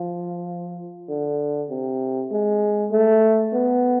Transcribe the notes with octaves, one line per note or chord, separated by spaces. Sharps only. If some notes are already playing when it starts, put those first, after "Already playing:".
Already playing: F3
D3
C3
G#3
A3
B3